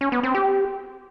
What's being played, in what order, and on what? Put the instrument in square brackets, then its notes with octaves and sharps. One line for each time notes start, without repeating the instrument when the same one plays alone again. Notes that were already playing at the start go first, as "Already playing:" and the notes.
[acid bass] C#4
B3
C4
G4